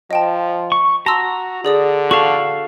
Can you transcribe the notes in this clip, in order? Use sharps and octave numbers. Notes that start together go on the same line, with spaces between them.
F3 D#5 G5 A5
C#6
F#4 A5 A#5 C6 E6
D3 G#4 D5 D#6
F#4 A4 F5 A5 C#6